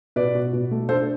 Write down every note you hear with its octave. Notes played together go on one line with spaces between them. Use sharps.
B2 B4 D5
B2
B2
A3
D4 A4 C5